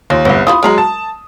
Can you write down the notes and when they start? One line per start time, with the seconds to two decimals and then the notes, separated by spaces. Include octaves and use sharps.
0.10 D#2 F4
0.25 G1 C2 B3
0.47 E4 F4 B4 D#6
0.63 F#3 G#3 A#4 A#5 B5
0.78 A5